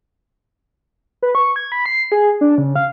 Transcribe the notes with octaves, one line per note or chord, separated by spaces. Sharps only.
B4
C#6
G#6
B5
C7
G#4
D4
C#3
F5